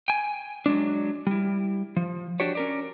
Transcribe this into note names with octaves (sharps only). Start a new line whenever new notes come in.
G5 G#5
F#3 G#3 D4
G3 E4
F3
D4 F#4 G4 C#5
C#4 A#4 D5